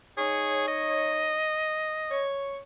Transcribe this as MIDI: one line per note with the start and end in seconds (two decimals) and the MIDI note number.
0.18 1.38 63
0.18 0.67 68
0.18 1.38 73
0.68 2.26 75
2.11 2.59 73